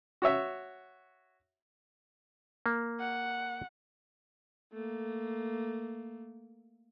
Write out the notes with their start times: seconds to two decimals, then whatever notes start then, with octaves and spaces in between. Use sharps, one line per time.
0.22 F#4 C#5 E5
2.66 A#3
3.00 F#5
4.73 A3 A#3